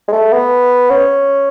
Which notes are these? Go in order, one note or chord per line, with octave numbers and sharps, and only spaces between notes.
G#3
A3
B3
C#4